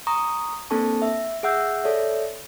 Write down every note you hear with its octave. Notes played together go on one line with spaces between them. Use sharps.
A#5 C#6 D#6
A#3 C4 D4 A4 A5 C#6
E5
G#4 E5 F#5 E6 G6
A4 C#5 D5 E5